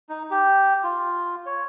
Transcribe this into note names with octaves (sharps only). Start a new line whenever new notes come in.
D#4
G4
F4
C#5